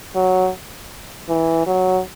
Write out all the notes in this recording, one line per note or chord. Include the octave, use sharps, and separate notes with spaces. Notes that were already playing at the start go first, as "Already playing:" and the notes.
F#3
E3
F#3